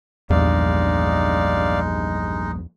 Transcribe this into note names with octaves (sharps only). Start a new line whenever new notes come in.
A#1 E2 G2 G#3 D#4 D5 F5